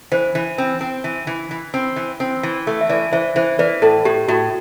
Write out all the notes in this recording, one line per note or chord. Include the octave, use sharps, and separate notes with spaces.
E3 C5
E3
C4
C4
E3
E3
E3
C4
E3
C4
E3
A3
E5
E3 B4 D5
E3 C5 E5
E3 C5 E5
E3 B4 D5
A2 A4
A2 G4
A2 F#4